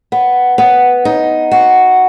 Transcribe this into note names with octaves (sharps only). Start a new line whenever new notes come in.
B3
B3
D#4
F#4